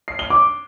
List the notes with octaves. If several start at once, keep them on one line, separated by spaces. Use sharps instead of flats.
C7
G7
D6